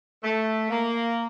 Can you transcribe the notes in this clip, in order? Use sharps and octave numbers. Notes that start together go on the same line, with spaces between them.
A3
A#3